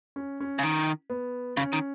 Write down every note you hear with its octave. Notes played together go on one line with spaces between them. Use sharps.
C#4
C#4
C#3
D#3
B3
C#3 C#4
D#3